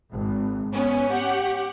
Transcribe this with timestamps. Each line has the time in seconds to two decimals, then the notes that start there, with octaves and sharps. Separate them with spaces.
0.11 G#1
0.72 B3 C#4
1.09 G4 F#5 C#6